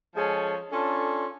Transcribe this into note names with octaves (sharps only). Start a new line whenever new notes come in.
F3 G#3 C#4 G#4 A4
C#4 D4 F4 A4